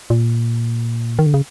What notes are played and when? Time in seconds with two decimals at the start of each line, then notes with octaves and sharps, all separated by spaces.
0.10 A#2
1.19 D#3
1.26 D3
1.34 C#3